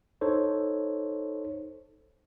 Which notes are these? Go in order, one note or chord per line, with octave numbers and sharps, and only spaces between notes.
D#4 A4 C5 C#5